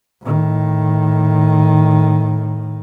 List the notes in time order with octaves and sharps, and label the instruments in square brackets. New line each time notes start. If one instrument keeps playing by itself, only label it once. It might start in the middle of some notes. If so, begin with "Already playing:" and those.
[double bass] A2 D#3